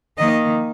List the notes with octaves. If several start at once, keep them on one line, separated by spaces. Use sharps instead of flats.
D#3 A#3 D#5